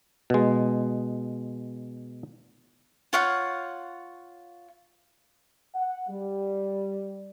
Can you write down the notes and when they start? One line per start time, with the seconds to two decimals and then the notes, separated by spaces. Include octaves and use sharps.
0.30 B2 G#3
3.13 F4 C#5 F5 F#5
5.75 F#5
6.09 G3